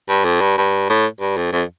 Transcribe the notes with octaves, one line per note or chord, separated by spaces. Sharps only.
G2
F2
G2
G2
A2
G2
F2
F2